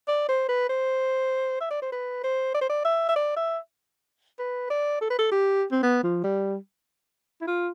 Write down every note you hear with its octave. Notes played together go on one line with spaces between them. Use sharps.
D5
C5
B4
C5
E5
D5
C5
B4
C5
D5
C5
D5
E5
E5
D5
E5
B4
D5
A4
B4
A4
G4
C4
B3
F3
G3
E4
F4